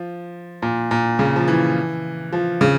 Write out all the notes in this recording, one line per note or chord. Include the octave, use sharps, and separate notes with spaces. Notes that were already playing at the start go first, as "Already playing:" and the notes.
Already playing: F3
A#2
A#2
C#3
F3
E3
F3
C#3